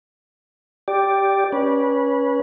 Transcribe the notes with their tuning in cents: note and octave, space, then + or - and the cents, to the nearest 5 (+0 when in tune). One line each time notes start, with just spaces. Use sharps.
G4 +0 D5 +0
C#4 +5 B4 -25